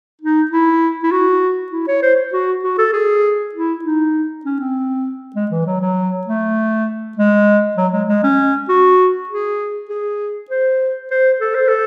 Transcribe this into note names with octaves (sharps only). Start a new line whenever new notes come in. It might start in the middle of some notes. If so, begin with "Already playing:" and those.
D#4
E4
E4
F#4
E4
C#5
C5
F#4
F#4
A4
G#4
E4
D#4
C#4
C4
G#3
E3
F#3
F#3
A3
G#3
F#3
G#3
G#3
C#4
F#4
G#4
G#4
C5
C5
A4
C5
A4